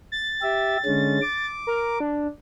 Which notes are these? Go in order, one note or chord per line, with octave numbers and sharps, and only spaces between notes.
A6
G4 E5
D3 G#3 C#4
D6
A#4
D4